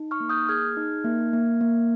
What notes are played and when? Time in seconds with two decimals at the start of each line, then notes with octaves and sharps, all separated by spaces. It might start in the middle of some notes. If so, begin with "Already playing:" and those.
Already playing: D#4
0.11 C#6 F6
0.20 A#3
0.29 D#6 G6
0.49 G#4 F6 G#6
0.77 D#4
1.04 A#3
1.33 A#3
1.61 A#3